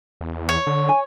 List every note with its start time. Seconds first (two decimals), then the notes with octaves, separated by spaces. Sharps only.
0.21 E2
0.49 C#5
0.67 D3
0.89 G#5